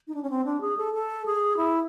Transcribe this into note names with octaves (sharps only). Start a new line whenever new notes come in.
D#4
D4
C#4
C4
D4
G#4
A4
A4
G#4
E4